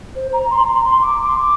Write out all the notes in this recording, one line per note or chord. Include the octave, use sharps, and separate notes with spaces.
C5
A#5
C6
A#5
C6
A#5
C6
D6
D6
C6
D6